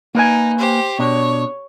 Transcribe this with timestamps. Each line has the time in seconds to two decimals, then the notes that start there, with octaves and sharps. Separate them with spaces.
0.15 A#3 D#4 B4 G#5
0.58 G4 C5
0.99 B2 D4 C#5